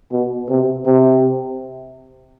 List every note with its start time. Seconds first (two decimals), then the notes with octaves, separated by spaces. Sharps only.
0.12 B2
0.49 C3
0.85 C3